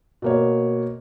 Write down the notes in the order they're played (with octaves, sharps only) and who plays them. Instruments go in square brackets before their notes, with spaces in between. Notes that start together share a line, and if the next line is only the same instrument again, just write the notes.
[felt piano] B2 A#3 C#5